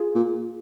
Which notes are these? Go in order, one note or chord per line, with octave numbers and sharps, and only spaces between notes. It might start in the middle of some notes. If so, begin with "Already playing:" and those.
Already playing: F4 G#4
A#2